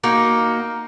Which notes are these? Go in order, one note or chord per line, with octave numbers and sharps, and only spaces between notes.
A#3 D#4 F#4